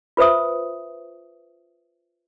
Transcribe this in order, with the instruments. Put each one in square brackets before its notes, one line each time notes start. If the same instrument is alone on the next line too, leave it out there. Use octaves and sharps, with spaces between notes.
[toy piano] F4 B4 C5 E5 D#6